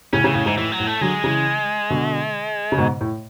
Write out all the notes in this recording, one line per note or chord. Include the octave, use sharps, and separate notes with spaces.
A2 C#3 C#4
A2 C#3 E3
A2 C#3
G#2 E3
A2 E3
F#3
A2
A3
D3 F#3 G#3
C#3 E3
B2 D3
C#3
G#2 B2
A2